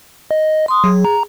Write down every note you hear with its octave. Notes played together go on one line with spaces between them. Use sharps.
D#5
C6 D#6
F#3 G#4
A#5